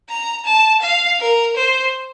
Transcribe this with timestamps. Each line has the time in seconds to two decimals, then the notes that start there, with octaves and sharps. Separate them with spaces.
0.09 A#5
0.46 A5
0.82 F5
1.20 A#4
1.56 C5